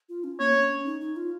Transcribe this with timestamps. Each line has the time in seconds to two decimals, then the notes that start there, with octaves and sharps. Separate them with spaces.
0.09 F4
0.24 C#4
0.40 A#3 C#5
0.54 C#4
0.70 C#4
0.86 D#4
1.01 D#4
1.16 F4